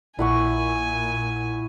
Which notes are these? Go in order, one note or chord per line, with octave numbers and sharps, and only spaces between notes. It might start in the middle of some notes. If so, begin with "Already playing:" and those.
A#1 A#2 E4 F#5 G#5 C#6